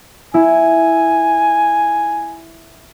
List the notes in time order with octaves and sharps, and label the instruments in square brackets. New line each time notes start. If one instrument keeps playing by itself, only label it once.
[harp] E4 [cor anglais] G#5